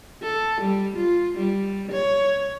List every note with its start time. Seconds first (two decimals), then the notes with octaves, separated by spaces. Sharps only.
0.22 A4
0.61 G3
0.97 F4
1.38 G3
1.92 C#5